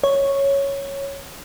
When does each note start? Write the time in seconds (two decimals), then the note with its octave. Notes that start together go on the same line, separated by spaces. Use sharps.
0.04 C#5